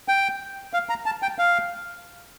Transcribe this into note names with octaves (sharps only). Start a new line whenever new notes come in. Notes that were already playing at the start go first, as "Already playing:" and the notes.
G5
F5
A#5
A5
G5
F5